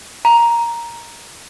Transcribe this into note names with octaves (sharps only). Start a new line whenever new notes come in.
A#5